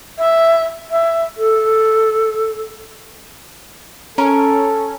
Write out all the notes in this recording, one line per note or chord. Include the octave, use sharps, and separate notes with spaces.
E5
E5
A4
C#4 A4 A#4